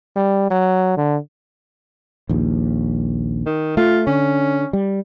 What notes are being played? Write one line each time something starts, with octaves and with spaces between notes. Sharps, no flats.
G3
F#3
D3
A#1 D#2
D#3
A3 F4
D3 C#4
G3